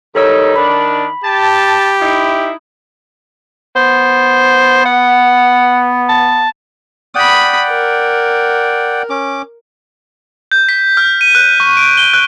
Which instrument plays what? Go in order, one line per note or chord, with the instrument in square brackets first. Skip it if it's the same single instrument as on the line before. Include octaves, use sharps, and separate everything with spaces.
[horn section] D#3 G3 D#4 [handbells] A4 C#5 E6
[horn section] D#3 D4 [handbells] B5
[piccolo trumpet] G4 [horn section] A5
[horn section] D#4 E4
[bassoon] B3 [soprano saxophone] C5
[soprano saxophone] F#5
A5
[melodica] D5 F#5 G5 [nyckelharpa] B5 D#6
[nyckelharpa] A#4
[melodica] C#4 D6
[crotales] G6
B6
F6
D#7
F#6
C#6
D7
G7
F#6